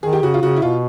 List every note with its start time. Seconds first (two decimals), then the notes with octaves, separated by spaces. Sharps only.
0.03 D#3 G#4
0.13 G4
0.22 C#3 F#4
0.34 F4
0.42 C#3 F#4
0.56 E4
0.62 B2 F4